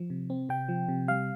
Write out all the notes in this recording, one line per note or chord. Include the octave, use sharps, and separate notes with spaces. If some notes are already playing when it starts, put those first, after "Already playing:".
Already playing: F3
C3
C4
C3 G5
F3
C3
G3 F5